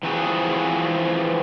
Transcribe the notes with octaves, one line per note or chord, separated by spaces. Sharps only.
E3 F3 C4 F#4 G#4